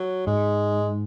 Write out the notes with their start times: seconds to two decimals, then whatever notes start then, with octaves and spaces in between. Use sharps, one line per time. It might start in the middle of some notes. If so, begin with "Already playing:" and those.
Already playing: F#3
0.26 G#2 G#3